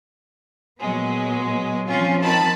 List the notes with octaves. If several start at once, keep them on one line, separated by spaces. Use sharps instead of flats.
A#2 F#3 G#3 B3
F3 C4 C#4 F4
D#3 A5 B5